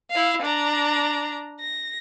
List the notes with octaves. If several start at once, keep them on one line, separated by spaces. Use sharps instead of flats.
E4 F5
D4 A#5
A#6